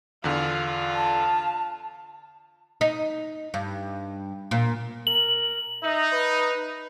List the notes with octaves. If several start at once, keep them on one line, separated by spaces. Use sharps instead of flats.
E2 D3 F4
A5
D#4
G2
A#2
A#4 F#7
D#4 E5
B4